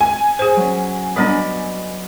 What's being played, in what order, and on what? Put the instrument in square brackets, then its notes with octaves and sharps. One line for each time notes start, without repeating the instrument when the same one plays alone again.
[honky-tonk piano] G#5
[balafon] G#4 C5
[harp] F#3 C#4
[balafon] G3 B3 D4 [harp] B4 D5 D#5